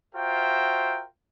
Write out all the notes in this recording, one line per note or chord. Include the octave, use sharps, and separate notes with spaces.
F4 F#4 A#4 C5 E5 G5